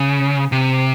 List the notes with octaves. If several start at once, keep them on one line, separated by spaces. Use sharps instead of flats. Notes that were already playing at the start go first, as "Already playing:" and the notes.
Already playing: C#3
C3